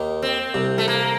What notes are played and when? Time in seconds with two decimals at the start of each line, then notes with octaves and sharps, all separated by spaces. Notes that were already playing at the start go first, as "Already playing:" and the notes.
Already playing: D#2 D#3
0.22 C4
0.54 C2 C3
0.78 A3
0.88 A#3